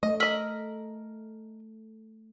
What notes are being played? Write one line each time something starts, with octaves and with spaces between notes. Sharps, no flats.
A3 D#5
A#4 D#5 E6 B6 F#7